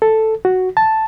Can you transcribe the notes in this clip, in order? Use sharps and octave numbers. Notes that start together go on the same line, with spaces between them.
A4
F#4
A5